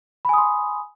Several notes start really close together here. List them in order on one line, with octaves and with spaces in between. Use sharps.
B5 G#5 D#6 C6